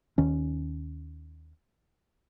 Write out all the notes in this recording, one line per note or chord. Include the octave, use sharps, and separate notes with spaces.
D#2 D#3 C#4